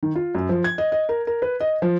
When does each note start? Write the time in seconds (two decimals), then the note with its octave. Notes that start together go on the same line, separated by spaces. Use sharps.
0.03 D#3
0.15 F4
0.35 F#2
0.49 F3
0.64 G#6
0.78 D#5
0.92 D#5
1.09 A#4
1.27 A#4
1.42 B4
1.60 D#5
1.82 F3